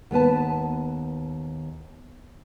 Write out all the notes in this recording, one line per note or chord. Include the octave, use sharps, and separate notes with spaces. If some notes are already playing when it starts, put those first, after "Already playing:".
D#2 B3 B4 A5